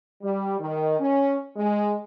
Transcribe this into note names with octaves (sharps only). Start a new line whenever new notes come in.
G3
D#3
C#4
G#3